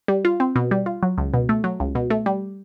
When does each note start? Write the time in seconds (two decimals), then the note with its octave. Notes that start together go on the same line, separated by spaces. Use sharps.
0.08 G3
0.25 F4
0.40 C4
0.56 B2
0.71 G3
0.86 F4
1.03 F#3
1.18 C#2
1.34 B2
1.49 A3
1.64 F#3
1.80 C#2
1.95 B2
2.10 A3
2.26 G3